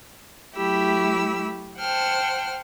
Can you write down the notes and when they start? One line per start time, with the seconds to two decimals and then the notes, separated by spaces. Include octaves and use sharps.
0.54 F#3 A3 E4 G4 B5 E6
1.79 C5 F#5 G5 A5 F6